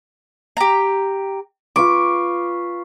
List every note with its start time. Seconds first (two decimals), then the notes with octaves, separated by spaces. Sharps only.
0.57 G4 A#5
1.76 F4 B4 C#6 D6